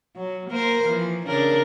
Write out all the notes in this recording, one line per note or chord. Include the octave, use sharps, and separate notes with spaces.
F#3
A#3 A#4 C5
E3 F3
C#3 D4 A#4